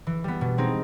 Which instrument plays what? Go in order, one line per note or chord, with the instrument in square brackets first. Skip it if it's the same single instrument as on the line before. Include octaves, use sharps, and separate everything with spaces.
[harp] E3
G3 B3
B2
G#3 C4 D#4